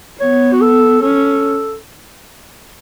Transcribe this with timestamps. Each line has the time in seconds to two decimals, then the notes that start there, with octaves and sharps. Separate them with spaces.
0.20 B3 C#5
0.53 F#4
0.61 A4
1.02 C#4 A4